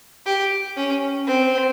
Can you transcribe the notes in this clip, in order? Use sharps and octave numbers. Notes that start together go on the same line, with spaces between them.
G4
C#4
C4